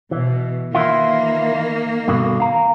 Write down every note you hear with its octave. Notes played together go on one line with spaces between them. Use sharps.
B2 E3
D#3 E3 A#3 E4 F4
G2 B2 D3
F5 A#5